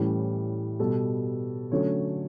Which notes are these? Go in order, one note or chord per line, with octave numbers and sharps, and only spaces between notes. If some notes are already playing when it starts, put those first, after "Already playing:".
Already playing: A2 E3 G3 C#4
B2 G3 B3 A4
D3 F#3 A3 C#4 C#5